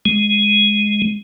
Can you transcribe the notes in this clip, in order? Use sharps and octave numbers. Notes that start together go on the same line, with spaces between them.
G#3